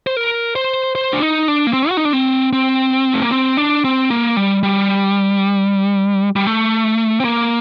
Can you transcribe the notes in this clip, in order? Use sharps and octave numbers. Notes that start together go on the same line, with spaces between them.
C5
A#4
C5
C5
D4
D#4
D4
A#3
C4
F#4
D#4
D4
C4
C4
A3
A#3
C4
D4
C4
A#3
G3
G3
G3
A3
C4
A#3